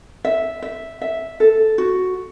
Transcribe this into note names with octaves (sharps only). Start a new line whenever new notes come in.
E5
E5
E5
A4
F#4